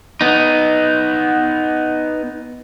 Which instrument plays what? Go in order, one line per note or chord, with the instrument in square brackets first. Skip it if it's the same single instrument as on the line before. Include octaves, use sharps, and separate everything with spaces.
[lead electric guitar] B3 D#4